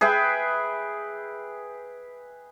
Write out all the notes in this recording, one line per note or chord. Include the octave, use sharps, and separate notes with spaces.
G#4 B4 E5 G5